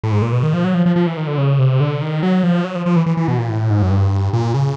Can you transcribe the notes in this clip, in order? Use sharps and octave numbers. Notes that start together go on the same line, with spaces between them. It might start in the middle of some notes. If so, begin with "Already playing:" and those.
A2
G#2
A#2
B2
D#3
F3
F#3
F3
F3
F3
E3
D#3
D3
C#3
C3
D3
D#3
F#3
F3
F#3
F3
F3
E3
E3
E3
B2
A#2
A2
G#2
F#2
G2
A#2
C#3